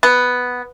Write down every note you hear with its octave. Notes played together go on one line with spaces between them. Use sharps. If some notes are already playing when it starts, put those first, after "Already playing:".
B3